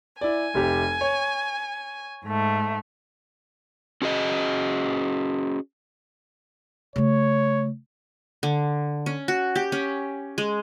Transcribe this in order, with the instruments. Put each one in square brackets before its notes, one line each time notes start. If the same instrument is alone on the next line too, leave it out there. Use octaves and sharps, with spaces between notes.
[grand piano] E4 D5 [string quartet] G#5
[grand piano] F1 C3 G4
C#5
[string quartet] G#2 A3
[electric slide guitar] C#4 F#4 G#4 D#5
[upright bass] C#3 A3 [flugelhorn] C#5
[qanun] D3
C#4
F#4
G4
C#4
G#3